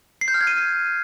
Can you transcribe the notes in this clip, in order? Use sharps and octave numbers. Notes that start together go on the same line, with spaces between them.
C7
G6
F6
G#6
D#7